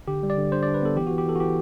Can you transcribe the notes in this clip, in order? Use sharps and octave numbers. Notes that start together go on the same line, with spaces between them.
D3 G4
G3
D5
D3
D4 C5
D4 D5
B4
B3 A4
E3 G4
E3 F#4
G4
E3 A4
F#4
E3 G4